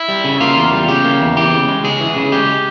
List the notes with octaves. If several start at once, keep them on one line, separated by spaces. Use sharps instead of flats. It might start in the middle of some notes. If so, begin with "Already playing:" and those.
Already playing: E4
G3
C#3
A#3 F4
E2
G3
C#3 G4
A#3
E2
E3 G4
C#3
G#3
C#2 G#4
E3
C#3
G#3 G4